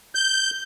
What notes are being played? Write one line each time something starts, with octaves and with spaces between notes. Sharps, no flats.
G6